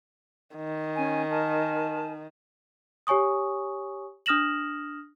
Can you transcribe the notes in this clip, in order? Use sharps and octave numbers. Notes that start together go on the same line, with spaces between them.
D#3
C#4 G#5
A#4 G#5 A5
G4 C#5 G#5 C#6 D#6
D4 D#6 F6 A#6 E7 F#7